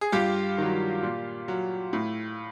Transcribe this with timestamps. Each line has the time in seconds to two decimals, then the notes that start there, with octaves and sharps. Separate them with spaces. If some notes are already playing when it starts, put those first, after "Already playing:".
0.01 G#4
0.12 G2 F4 G4
0.58 D#3 F#3
1.03 A#2
1.48 F#3
1.93 A2